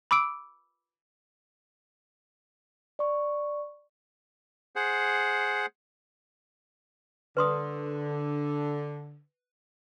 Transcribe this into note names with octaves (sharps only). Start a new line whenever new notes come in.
B5 D6 E6 D7
D5 C#6
G#4 C5 F#5
D3 B4 C6 D#6